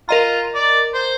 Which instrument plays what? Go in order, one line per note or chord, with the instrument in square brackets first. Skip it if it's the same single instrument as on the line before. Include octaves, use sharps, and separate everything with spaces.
[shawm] F4 [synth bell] A#4 D#5 A#5
[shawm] D5
C5